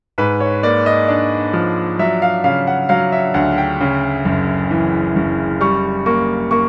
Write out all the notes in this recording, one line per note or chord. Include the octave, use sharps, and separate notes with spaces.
G#2 B4
C#5
A#3 D5
D#5
D4
F3
F#3 E5
F5
C#3 F5
F#5
F#3 F5
E5
D2 F#5
G5
C#3
F#1
E3
F#1
G3 C#6
A#3 C#6
A#3 C#6